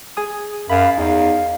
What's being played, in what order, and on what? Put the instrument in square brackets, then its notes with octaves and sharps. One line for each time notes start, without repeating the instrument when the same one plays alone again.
[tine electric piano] G#4 G#5 D#6
[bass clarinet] F#2 [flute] F5 [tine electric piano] B5
[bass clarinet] E2 [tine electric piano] D#4 [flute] F5